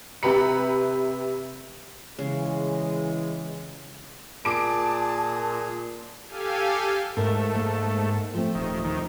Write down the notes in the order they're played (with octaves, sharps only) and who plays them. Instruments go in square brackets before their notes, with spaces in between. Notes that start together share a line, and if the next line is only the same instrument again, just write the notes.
[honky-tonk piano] C3 G4 B4 A#5 B5 C#7
[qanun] C#3 [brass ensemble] E3 G#3
[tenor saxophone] A#2 [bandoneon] G#4 [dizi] A5 [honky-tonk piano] D6 D7
[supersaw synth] G4 A4 F5 G#5
[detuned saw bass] G#2 [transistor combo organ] A3 [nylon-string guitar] A#4
[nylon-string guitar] A#3
F3 A3 C4
[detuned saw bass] D#1 [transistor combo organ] D#3
[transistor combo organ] D#2 D#3